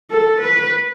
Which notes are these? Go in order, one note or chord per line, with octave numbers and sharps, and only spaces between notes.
A4
B4